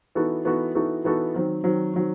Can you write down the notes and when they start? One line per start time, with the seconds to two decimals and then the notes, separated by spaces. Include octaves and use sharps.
0.15 E3 B3 D#4 F#4 A4
0.45 E3 B3 D#4 F#4 A4
0.75 E3 B3 D#4 F#4 A4
1.04 E3 B3 D#4 F#4 A4
1.34 D#3 F#3 C4
1.64 D#3 F#3 C4
1.94 D#3 F#3 C4